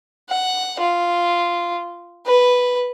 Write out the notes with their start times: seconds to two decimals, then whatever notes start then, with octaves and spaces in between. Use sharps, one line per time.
0.29 F#5
0.80 F4
2.26 B4